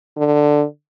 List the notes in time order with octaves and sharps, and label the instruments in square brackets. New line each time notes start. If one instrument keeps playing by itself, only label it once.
[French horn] D3